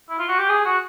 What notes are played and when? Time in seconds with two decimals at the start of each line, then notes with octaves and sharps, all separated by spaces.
0.10 E4
0.19 F4
0.29 F#4
0.39 G4
0.49 G#4
0.65 F#4